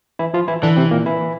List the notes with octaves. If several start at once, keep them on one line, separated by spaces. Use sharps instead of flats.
E3 E4
F3 F4
E3 E4
D3 E3 D4
C3 C4
A#2 A#3
E3 E4